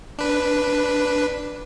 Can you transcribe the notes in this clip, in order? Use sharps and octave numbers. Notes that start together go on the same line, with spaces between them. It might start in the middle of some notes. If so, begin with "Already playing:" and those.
D4 B4